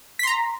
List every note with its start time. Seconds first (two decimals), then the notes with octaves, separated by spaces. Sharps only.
0.19 B6
0.23 C6
0.27 A#5